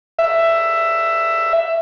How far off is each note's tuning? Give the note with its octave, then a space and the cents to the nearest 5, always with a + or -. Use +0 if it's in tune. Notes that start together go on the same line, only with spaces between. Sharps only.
E5 +10